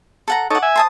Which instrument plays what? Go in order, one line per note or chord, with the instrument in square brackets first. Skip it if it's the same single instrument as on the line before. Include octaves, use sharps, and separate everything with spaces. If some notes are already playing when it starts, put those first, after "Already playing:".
[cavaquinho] A4 F#5 A#5
[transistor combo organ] D#4 A4 C#5 [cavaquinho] F#5 D6
[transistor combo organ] E5 G#5
[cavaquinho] C5 A5 D#6